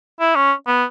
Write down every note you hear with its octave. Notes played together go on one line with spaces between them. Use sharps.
E4
C#4
B3